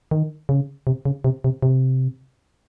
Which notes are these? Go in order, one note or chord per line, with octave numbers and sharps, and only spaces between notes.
D#3
C#3
C3
C#3
C3
C3
C3